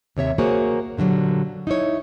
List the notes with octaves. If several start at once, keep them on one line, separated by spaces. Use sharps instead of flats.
D#2 C3 C#5 E5
A#3 F#4 G#4 C5 C#5
A#2 D3 E3 F#3 G3
D#4 E4 C#5